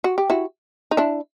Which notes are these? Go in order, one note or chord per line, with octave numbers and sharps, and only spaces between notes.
F#4
G4
E4 F#4
D#4
D4 E4